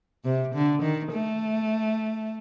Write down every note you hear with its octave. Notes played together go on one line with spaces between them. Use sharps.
C3
D3
D#3
A3